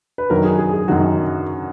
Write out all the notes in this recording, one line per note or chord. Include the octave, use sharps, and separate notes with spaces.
B4
F#2 D#3 F#3 A#4
G#4
G#4
G#4
F#2 D#3 F#3 F#4